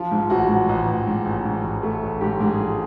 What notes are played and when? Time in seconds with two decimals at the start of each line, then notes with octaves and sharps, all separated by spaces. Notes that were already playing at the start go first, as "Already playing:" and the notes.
Already playing: F3 F4
0.11 G#2
0.30 A1 F#4
0.49 G#2
0.69 A1
0.88 A1
1.07 G#2
1.25 A1
1.45 G#2
1.64 A1
1.83 A3
2.03 A1
2.21 G#2 G4
2.40 G#2
2.47 G#4
2.59 F3